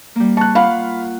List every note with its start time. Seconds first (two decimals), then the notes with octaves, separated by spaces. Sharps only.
0.16 G3 A#3
0.37 A5 C#6 F#6
0.55 F4 F5 F#5 B5